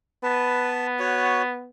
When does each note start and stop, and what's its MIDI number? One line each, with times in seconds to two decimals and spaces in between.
0.23 1.70 59
0.23 0.87 71
0.23 0.87 81
0.99 1.42 66
0.99 1.42 73